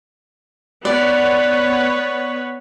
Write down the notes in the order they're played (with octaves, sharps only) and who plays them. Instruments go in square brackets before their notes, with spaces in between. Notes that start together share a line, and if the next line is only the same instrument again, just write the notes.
[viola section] B3 B4 C#5 [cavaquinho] D5